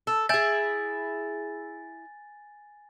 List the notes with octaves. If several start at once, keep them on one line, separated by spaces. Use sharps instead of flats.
A4
E4 G#4 G#5 G6 A6